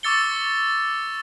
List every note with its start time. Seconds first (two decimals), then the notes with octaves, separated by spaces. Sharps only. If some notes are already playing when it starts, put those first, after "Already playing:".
0.03 C#6 D6 E6 A6 C#7 G7